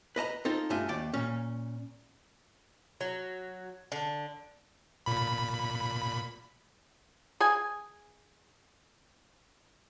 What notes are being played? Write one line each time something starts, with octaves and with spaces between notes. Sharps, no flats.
B4 D#5 A5 A#5
C4 D#4 F4 A4
G2 A3 F4 G#5
D#2 D5 G5
A#2 C#4
F#3
D3
A#2 B5
G#4 G#5